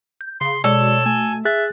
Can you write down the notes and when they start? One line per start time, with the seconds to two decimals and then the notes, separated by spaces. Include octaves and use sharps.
0.21 G6
0.41 C#3 C6
0.64 B2 G#3 A4 C#5 D5
1.06 A3 G#5
1.45 G#4 E5 F#6 A6